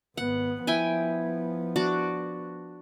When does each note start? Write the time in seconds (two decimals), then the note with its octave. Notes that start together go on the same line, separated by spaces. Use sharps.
0.17 G#1 B3 F#5
0.67 F3 B3 E4 G5 G#5
1.76 D4 F#4 D6